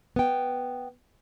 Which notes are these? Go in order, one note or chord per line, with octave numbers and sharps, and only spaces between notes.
B3 G5